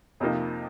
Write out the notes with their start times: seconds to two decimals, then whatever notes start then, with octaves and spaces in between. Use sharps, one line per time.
0.20 F2 C3 F3 A#3 D#4